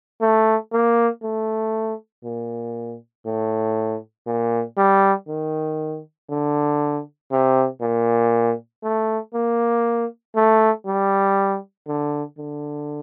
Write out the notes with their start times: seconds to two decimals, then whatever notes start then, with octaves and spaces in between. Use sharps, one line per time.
0.21 A3
0.72 A#3
1.23 A3
2.24 A#2
3.26 A2
4.27 A#2
4.77 G3
5.28 D#3
6.29 D3
7.31 C3
7.82 A#2
8.83 A3
9.34 A#3
10.36 A3
10.86 G3
11.88 D3
12.38 D3